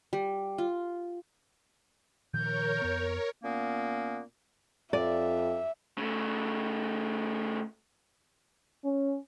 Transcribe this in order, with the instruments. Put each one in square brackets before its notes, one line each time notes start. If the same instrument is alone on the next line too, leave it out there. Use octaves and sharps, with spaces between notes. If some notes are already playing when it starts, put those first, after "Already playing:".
[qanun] G3
F4
[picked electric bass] A#2 D#3 F3 [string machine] A#4 C#5 [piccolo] G6
[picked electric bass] F2 B3
[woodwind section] A#2 A#3 B3 C#4
[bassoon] F2 [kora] D5 [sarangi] E5
[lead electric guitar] C#3 A3
[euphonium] C#4